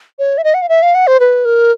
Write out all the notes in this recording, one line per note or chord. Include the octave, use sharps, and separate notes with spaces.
C#5
E5
D#5
F#5
F5
E5
F5
F#5
C5
B4
A#4